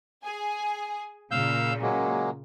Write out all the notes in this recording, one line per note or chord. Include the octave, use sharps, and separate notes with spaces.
G#4 G#5
A#2 C#3 F5 E6 G6
F#3 G#3 A#3